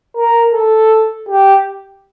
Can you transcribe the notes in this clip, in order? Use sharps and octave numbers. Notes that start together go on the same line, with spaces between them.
A#4
A4
G4